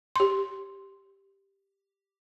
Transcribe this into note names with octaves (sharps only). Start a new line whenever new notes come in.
G4 C6